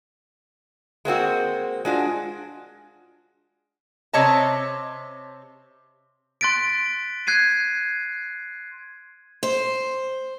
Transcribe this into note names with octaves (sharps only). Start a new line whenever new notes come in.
G#3 A#3 C4 F#4
G#3 D4 F4 F#4
C3 C#5 D#5 A5
C6 F#6 A6 B6 D7
F#6 G#6 C7 D#7
C5